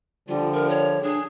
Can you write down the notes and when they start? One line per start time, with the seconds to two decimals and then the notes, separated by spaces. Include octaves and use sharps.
0.29 D3 F3 G3 F4
0.53 A#4
0.69 C#5
1.03 D4 G#4